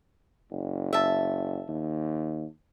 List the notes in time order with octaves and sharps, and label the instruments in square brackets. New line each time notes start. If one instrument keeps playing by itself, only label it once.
[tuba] F#1
[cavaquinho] E5 A5
[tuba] D#2